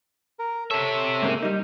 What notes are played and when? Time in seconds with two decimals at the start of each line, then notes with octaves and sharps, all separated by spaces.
0.39 A#4
0.71 C3 A4 C#5 E5
1.22 G#2 C#3 A#3
1.42 G3 D#4